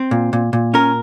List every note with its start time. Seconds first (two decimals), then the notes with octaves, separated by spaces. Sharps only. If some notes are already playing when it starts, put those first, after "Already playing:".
Already playing: C4
0.11 A#2
0.33 A#2
0.53 A#2
0.74 C#4 A#4